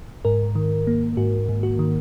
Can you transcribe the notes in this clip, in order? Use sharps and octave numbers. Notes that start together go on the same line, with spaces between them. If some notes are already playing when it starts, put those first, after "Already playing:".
G#2 A#4
D#3
A#3
G#2 F#4
G#2
F#4
D#3